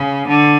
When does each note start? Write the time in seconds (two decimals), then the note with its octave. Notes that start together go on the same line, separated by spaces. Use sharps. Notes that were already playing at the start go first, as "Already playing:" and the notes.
Already playing: C#3
0.28 D3